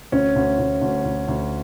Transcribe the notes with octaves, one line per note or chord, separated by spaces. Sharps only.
D2 C#4
D2
D2
D2
D2
D2